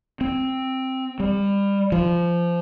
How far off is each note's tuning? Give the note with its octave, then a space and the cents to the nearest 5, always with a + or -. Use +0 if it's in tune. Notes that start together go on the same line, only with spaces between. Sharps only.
C4 +0
G3 +25
F3 -20